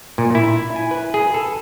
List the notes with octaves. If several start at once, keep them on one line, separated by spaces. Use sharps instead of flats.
A#2
E4
G#5
B4
G#4
A4